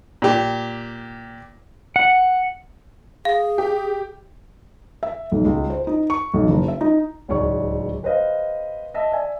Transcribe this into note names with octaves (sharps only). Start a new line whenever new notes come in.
A#2 G4
F#5
G#4 F5
G4
E5
B1
C#2
C5
D#4
C#6
B1
F#1
E5
D#4
D1 C#2 D#4 C#5 D5 C#6
G4 B4 C5 D#5 F5
D#5 E5 A5
D5 E5 G#5